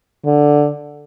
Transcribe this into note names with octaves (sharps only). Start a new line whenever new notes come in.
D3